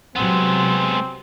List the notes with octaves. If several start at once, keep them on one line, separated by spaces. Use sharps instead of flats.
C3 F#3 G#3 B3 C4